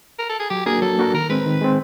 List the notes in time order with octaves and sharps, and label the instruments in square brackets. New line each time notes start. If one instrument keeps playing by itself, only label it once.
[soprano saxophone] A#4
A4
G#4
[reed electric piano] F#3 [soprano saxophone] G4
[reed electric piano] A#3 D4 F#4 A#4 [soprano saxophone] G#4
[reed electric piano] F#3 [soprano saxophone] A4
[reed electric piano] A#3 D4 F#4 A#4
[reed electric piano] D#3 [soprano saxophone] A#4
[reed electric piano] G#3 C4 [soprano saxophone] B4
[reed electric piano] D#3
G#3 C4